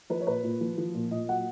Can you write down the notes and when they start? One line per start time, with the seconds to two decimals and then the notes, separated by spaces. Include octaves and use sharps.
0.10 F3 B4
0.21 C#5
0.27 A#2 B4
0.44 A#2
0.61 F3
0.78 F3
0.94 A#2
1.11 A#2 D#5
1.29 F#3 F#5